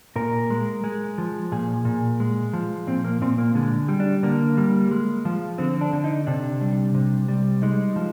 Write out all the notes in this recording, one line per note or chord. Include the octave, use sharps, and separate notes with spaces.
A#2 A#4
G#3
G#3
F3
A#2 G#4
A#2
G#3
F3
A#2 C4
A#3
A#2 C4
A#3
D3 G#3
G3
D4
D3 A#3
G3
G#3
F3
D3 C4
D4
D3
D#4
C3 D4
G3
C3
G3
G#3 D#4
F3